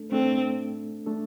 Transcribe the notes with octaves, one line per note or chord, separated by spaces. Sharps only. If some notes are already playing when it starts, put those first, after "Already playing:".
Already playing: A3 D4 A4
A3 C4 D4 A4
A3 D4 A4